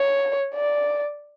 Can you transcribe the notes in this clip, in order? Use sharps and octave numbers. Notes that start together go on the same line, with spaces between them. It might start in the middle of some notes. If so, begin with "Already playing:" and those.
Already playing: C#5
D5